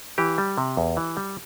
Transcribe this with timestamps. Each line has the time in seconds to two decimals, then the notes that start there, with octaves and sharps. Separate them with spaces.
0.18 E3 G4
0.38 G3
0.58 C3
0.77 E2
0.97 E3
1.17 G3